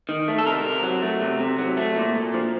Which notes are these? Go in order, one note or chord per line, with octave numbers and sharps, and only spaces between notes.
D#3
A3
A4
C3 A#4
C3
F#3
A3
C3
C3
F#3
A3
A#2
A#2
F3